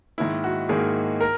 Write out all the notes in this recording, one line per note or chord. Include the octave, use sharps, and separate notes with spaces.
G#2 D#3 A#3 E4
F#4
G#2 D#3 A#3 G#4
A#4